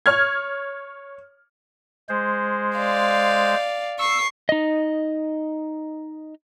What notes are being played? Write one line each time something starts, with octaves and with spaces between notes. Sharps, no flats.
C#5 F6 G#6
G#3 C5
D5 F5
C#6 E6 C7
D#4 D#5